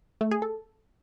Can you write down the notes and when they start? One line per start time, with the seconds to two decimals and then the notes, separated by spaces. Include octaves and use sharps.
0.21 A3
0.31 G#4
0.42 A4